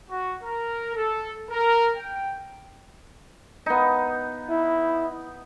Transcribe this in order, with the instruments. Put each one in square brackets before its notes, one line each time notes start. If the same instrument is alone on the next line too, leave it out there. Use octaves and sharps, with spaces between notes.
[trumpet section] F#4
A#4
A4
A#4
G5
[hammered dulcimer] B3 D#4
[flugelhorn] E4